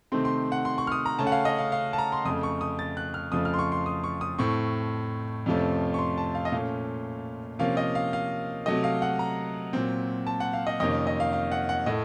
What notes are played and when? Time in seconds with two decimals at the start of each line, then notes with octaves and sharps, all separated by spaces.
0.12 C3 D#3 A3 C4 C6
0.25 C6
0.52 F#5
0.65 C6
0.78 C#6
0.87 F6
0.92 D#6
1.06 A#5
1.19 C#3 A3 C#4 A5
1.27 F#5
1.32 F5
1.45 D#5
1.59 F5
1.72 F5
1.93 A5
1.98 A#5
2.12 C6
2.25 F2 C#3 A3 D#6
2.43 C#6
2.61 D#6
2.79 A6
2.97 F#6
3.14 F6
3.32 F2 C#3 F3 A3 D#6
3.45 F6
3.54 C6
3.59 C#6
3.72 C6
3.86 D#6
4.04 C#6
4.21 D#6
4.38 A2 A3 C4 C#6
5.46 F2 C3 F3 A3 C#4
5.94 C#6
5.99 C6
6.18 A5
6.35 F5
6.45 D#5
6.52 A#2 A3 C#4 F5
7.59 C3 F3 A#3 C#4 F5
7.77 D#5
7.95 F5
8.13 F5
8.66 C3 F#3 A3 D#5
8.84 F5
9.02 F#5
9.19 A#5
9.73 A#2 F#3 C4
10.27 A5
10.40 F#5
10.53 F5
10.67 D#5
10.80 F2 C3 D#3 A#3 C#4 D#5
11.07 D#5
11.20 F5
11.33 F5
11.51 F#5
11.69 F#5
11.86 A2 A3 D#5